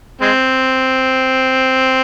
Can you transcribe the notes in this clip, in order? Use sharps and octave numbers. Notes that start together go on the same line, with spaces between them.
G#3 C4